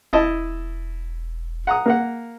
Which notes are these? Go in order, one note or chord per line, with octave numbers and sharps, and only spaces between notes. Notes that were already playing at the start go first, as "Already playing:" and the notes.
E1 E4 D#5 A5
F#5 A#5 D#6
A#3 A#4 F#5